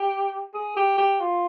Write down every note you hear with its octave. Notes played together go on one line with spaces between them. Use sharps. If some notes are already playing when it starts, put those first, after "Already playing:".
Already playing: G4
G#4
G4
G4
F4